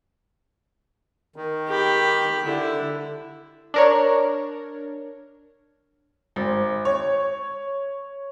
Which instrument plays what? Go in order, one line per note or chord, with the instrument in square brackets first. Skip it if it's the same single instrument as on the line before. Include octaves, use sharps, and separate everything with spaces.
[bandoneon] D#3
[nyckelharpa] G4 B5
[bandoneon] D3 [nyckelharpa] E4
[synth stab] D4 A#4 C#5
[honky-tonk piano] G#1
C#5